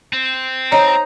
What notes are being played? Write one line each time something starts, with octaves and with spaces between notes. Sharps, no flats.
C4
D#4 C5 C#5 A#5